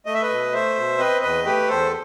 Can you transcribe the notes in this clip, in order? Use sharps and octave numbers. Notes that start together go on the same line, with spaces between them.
A3 D#5
E5
B4 D#5
B2
A3 C5 E5
B2
C4 B4 D#5
E2 B4 D#5
A3 G4 B4
E2 A4 C5